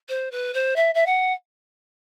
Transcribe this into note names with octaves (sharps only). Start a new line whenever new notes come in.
C5
B4
C5
E5
E5
F#5